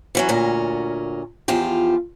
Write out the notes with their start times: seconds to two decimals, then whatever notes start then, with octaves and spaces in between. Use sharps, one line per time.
0.15 E3 F#3 C#4
0.29 D2 A#2 C#4 A#4
1.48 E2 F3 F4 G4